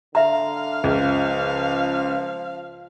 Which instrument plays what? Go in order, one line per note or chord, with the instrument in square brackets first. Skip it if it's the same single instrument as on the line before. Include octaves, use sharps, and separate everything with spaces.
[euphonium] D3 [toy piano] E5 A#5 [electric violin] F5
[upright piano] C#2 [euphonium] F3